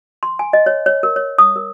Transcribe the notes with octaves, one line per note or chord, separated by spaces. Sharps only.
C6
G#5
D#5
C#5
C#5
A#4
C#5
D#6
A#4